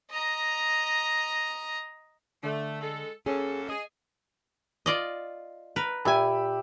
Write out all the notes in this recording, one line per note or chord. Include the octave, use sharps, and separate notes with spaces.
D#5 A#5
D3 A3
G#3 A4
F#2 A#3 C#4 G#4 A4
G#4 D#5
F4 D5 D#5
A#4 B4
A#2 G4 E5 G#5 B5